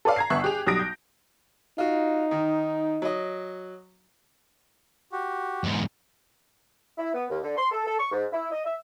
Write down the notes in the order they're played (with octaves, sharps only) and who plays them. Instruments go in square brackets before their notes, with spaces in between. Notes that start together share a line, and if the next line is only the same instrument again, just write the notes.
[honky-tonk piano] A4 B4 C#5 D5 F5
A#5 G#6 C7
G1 B3 E5 C#6 F#6
G4 G#4 F7
B1 G3 D#6 A#6 D7
G6
[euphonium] D#4 [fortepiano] F4 F#4
[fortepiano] D#3
F#3 D#5
[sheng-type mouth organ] F#4 G4
[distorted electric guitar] E2 G#2
[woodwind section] E4
B3
D#2
D3
C6
A4
A4
C#6
G#2
E4
D#5
E5